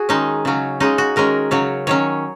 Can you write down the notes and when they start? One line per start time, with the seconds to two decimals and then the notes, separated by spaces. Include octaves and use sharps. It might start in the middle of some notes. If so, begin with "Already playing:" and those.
Already playing: F#4 G#4
0.09 D#3 G#3 C#4 D#4
0.45 C#3 F#3 C#4
0.80 C#3 G#3 C#4 D#4
0.98 F#4
1.16 D#3 G#3 C#4 A#4
1.51 C#3 F#3 C#4 C#5
1.87 D#3 F#3 C#4 C#5